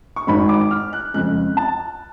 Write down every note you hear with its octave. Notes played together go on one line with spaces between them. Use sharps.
C#6
G#1 G#2 G#3 B5
D6
F6
F#6
F2 C#3 G#3 F#6
A5